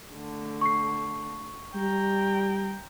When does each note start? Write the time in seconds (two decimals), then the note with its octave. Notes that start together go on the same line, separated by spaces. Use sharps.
0.14 D3 A3
0.61 C#6 C7
1.75 G3 G5 A#5